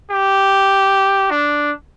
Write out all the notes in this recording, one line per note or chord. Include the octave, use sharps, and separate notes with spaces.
G4
D4